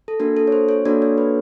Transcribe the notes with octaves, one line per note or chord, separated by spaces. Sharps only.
A4
A#3 D4 F#4 A4 A#4
A4
C#5
C5
C#5
A#3 D4 F#4 A4 D5
C#5
B4